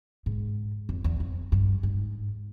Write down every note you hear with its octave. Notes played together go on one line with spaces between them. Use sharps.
G#2
F2
E2
F2
G2
G#2